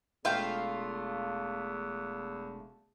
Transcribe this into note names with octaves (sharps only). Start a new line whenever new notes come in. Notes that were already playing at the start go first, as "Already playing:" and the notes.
E1 E2 A3 F4 C5 F5 G5